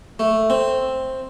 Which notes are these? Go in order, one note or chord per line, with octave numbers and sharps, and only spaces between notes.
A3
C4